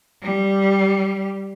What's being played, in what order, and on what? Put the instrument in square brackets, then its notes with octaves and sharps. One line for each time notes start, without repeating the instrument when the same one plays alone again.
[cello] G3